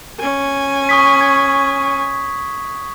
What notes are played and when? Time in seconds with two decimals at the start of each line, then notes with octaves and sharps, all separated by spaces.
0.20 C#4 G#5
0.89 C#6 D#6 B6
1.21 G#6